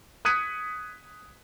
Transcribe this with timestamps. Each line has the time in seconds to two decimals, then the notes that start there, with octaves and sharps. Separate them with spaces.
0.25 D#6 F#6 G#6 B6 C#7 D#7